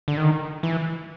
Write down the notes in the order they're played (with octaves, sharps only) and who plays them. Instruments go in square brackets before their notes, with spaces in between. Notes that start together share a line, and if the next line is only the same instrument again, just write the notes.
[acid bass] D3
D#3
E3